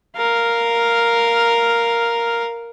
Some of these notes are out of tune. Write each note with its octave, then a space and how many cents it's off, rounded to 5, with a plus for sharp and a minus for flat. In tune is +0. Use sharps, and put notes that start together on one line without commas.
A#4 +0 F5 +0